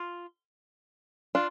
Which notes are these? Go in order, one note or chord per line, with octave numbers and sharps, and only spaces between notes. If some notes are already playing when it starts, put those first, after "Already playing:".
Already playing: F4
D4 F4